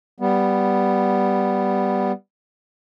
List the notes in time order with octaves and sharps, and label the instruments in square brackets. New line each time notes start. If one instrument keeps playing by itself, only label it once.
[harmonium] G3 B3